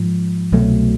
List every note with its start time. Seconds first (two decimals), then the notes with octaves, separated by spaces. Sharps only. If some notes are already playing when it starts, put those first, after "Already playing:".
Already playing: G#2 F3
0.52 C2 B2 F#3 A3